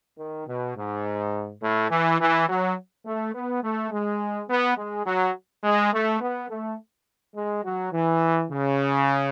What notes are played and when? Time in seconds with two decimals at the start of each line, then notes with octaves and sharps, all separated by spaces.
0.18 D#3
0.48 B2
0.76 G#2
1.62 A2
1.90 E3
2.20 E3
2.48 F#3
3.06 A3
3.35 B3
3.63 A3
3.91 G#3
4.49 B3
4.77 G#3
5.06 F#3
5.64 G#3
5.92 A3
6.21 B3
6.50 A3
7.35 G#3
7.64 F#3
7.93 E3
8.51 C#3